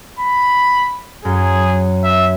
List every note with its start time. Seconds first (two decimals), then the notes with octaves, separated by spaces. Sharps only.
0.19 B5
1.25 F#2 G#4
2.04 E5